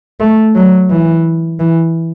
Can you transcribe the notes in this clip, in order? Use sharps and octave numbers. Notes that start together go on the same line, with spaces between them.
A3
F#3
E3
E3